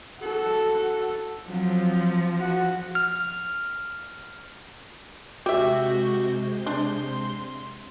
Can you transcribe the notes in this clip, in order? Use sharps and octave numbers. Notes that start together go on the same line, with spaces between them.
F#4 A4
F3 F#3 C4
F#4 F#5
F6
C3 G#3 F#4 G4 E5 G6
D4 C6